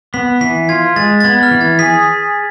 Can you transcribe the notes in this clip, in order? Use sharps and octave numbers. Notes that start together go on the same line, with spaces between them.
B3 B6
E3 B6
F4 G#6
G#3 A6
A6
B3 G#6
F6
E3
G#6
G#4 B6